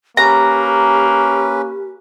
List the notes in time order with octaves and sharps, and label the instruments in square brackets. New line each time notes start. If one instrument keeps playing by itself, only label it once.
[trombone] A#3 [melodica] C#4 B4 [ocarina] G4 [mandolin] A#5